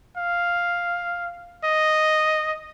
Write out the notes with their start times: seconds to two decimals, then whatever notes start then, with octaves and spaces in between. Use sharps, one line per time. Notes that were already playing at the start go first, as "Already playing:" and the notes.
0.17 F5
1.64 D#5